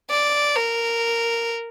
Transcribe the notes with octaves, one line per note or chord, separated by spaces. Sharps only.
D5
A#4